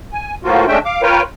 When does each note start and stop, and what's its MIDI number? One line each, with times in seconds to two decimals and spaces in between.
0.12 0.35 80
0.44 0.66 45
0.44 0.66 53
0.44 0.66 58
0.44 0.66 65
0.44 0.66 66
0.68 0.79 56
0.68 0.79 57
0.68 0.79 61
0.68 0.79 62
0.68 0.79 76
0.68 0.79 79
0.85 1.01 77
0.85 1.01 86
1.02 1.22 65
1.02 1.22 70
1.02 1.22 71
1.02 1.22 73
1.02 1.22 79